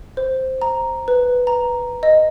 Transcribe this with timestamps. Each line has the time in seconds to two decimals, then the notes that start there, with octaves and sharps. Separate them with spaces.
0.17 C5
0.62 A#5
1.08 B4
1.47 A#5
2.03 D#5